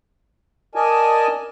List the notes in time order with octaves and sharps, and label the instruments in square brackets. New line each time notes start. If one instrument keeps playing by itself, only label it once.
[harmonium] A#4 D5 D#5 G#5 A5